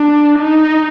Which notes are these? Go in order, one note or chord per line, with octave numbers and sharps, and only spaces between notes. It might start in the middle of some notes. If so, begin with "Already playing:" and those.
Already playing: D4
D#4